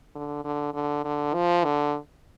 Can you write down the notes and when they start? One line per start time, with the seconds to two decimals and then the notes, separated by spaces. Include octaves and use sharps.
0.15 D3
0.45 D3
0.74 D3
1.04 D3
1.34 F3
1.65 D3